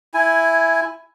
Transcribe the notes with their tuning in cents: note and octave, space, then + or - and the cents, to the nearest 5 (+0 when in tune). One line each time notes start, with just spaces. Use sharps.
E4 +0 G#5 +0